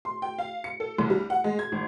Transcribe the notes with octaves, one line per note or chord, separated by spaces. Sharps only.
C6
G5
F5
C#7
A4
C2
G3
F#5
G#3
G#6
G#1